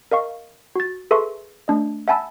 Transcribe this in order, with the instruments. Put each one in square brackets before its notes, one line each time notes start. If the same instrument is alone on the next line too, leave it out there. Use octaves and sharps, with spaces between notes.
[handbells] A#4 D#5 F5 C#6
F#4 A6
G#4 A4 B4 E5 C6 C#6
A3 D4 D#5
E5 F#5 G#5 A5 B5 E6